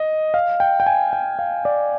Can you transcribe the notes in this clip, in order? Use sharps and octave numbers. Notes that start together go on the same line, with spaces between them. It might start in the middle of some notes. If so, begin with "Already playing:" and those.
Already playing: D#5
F5
G5
G5
G#5
G5
F5
D5